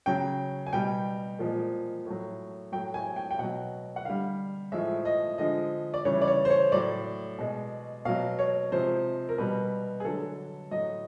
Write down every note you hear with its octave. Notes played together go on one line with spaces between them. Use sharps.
C#3 F#3 G5
G#5
B2 G3 G5
A#2 F3 G#3
A2 F#3
A2 F#3 G5
G#5
G5
G5
B2 F#3 F#5
F#5
D3 G3 F5
A2 F3 G#3 E5
D#5
D3 F3 G#3 D#5
D5
C#3 E3 G3 C#5
D5
C#5
C5
C#5
A2 F#3 D5
B2 G#3
B2 F#3 F5
C#5
C3 F3 G#3 C5
A#4
B2 G3 B4
G#4
D3 F#3 A4
A2 F#3 D#5